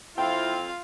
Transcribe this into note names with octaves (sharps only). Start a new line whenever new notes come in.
F2 A#2 C4 E4 F4 F5 G5